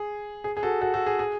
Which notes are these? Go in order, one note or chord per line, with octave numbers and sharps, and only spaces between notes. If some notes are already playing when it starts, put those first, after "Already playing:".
Already playing: G#4
G#4
G#4
F#4 A4
F#4 A4
F#4 A4
G#4
G#4